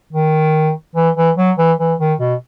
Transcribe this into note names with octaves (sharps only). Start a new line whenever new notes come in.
D#3
E3
E3
F#3
E3
E3
D#3
B2